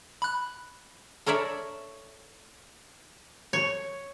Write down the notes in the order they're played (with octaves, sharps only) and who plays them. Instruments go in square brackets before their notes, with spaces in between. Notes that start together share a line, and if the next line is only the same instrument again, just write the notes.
[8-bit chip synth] B5 F#6
[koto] A4 A#4 C#5 D5 E5
C#5